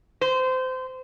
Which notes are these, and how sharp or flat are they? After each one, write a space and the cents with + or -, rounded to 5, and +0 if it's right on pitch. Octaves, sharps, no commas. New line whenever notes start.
C5 -25